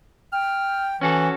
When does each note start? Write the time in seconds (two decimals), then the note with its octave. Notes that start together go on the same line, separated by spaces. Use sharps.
0.33 G5 F6
1.01 E3 C#4 F#4 A4